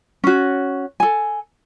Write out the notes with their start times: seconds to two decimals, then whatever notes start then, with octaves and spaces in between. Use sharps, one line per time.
0.24 C#4 F#4
1.00 A4 G#5